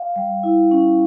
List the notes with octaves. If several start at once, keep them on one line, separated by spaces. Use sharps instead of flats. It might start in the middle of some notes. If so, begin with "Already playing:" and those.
Already playing: F5
G3
E4
C#4